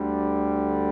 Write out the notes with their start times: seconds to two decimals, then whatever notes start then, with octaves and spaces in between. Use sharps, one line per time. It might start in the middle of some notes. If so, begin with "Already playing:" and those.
Already playing: D2 D3 G3